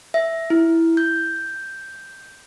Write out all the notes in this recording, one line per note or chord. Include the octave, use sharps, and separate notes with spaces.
E5
E4
G6